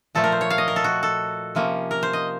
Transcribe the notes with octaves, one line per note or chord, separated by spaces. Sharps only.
A#2 F3 A3 A4
A#4
C5
C#5
F5
D#5
A#4
A4
F#4
A4
C3 F3 A#3 C#4
A#4
C5
D#5